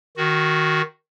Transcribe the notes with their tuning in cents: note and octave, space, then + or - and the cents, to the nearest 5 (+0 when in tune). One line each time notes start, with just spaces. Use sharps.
D#3 +0 F#4 +0